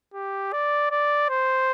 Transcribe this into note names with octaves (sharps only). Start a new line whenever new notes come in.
G4
D5
D5
C5